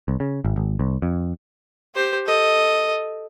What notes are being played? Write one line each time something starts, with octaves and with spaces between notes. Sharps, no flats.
C2
C#3
G#1
G#1
C2
F2
G4 C5
A4 D#5